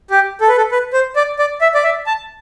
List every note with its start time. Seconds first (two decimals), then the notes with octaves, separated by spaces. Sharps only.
0.10 G4
0.41 A4
0.48 B4
0.57 A4
0.72 B4
0.93 C5
1.16 D5
1.39 D5
1.61 E5
1.74 D5
1.83 E5
2.06 A5